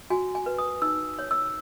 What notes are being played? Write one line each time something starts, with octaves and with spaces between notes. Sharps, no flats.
F#4 G#5
G#5
B4
D#6
D#4 E6
C#5
E6